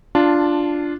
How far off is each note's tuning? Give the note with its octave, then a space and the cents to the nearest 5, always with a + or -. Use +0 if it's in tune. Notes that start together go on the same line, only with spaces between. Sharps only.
D4 +0 F4 -5 A5 +15